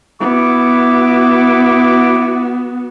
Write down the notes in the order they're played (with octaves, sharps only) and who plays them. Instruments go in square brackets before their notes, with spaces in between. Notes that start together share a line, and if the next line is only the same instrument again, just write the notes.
[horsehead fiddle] B3 F#4 [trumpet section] E4 D6